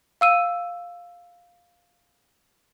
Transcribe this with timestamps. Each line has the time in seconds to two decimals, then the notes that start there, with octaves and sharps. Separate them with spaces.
0.21 F5 E6 D#7